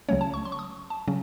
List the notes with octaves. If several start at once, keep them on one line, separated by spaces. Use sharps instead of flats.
C#2 C#3 F#3 A3 C#4 C#5
A5
C#6
C6
C#6
D#6
A5
C#3 F#3 C#4